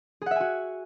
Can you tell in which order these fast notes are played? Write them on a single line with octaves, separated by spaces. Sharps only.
G#4 F#5 E5 G#5 F#4